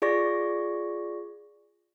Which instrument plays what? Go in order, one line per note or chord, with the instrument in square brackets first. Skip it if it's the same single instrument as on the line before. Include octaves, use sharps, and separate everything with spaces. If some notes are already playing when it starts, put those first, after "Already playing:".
[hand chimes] F4 G#4 D5 C#6 A#6